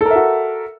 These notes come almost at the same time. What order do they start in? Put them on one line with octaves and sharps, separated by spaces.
A4 A#4 E5 F#4